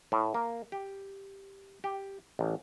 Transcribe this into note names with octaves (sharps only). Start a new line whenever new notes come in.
A2
A#3
G4
G4
A1